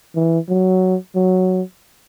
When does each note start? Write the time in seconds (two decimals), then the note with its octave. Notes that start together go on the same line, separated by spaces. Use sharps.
0.15 E3
0.49 F#3
1.15 F#3